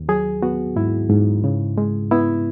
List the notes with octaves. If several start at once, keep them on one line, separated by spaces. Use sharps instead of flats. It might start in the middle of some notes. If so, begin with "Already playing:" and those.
Already playing: D#2
F#3 G#4
B3 F#4
G#2 E4
G#2
C#3
G#3
B3 E4